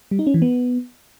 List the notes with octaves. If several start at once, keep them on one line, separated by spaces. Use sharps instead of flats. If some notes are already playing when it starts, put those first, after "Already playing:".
G3
D#4
C#4
E3
B3